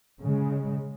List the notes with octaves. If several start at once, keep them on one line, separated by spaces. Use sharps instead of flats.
C#3 G#3